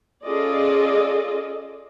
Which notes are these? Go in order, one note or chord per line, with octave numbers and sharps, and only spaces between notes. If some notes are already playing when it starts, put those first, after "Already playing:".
C#4 F4 G#4 A4 D5 D#5